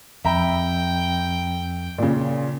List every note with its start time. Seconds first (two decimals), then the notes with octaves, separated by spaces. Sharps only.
0.25 F2 E5 G5 A#5 B5
1.98 A#2 C#3